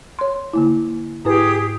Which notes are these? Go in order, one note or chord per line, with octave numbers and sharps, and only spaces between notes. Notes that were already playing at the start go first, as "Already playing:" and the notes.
C#5 C6
D3 A#3 E4
G#2 E4 G4 G#4 B4 D#6